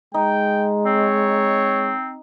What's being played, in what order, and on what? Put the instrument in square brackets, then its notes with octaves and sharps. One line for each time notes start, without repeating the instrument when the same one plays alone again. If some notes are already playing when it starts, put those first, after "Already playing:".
[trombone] G#3 [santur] D#4 [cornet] G5
[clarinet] C4 [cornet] C#5